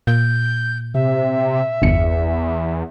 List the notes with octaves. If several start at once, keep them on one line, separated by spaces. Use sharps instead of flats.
A#2 G6
C3 E5
G1 E2 C#7